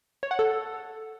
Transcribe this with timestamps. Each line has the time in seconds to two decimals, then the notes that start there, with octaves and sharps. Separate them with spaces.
0.23 C#5
0.31 F#5
0.39 A4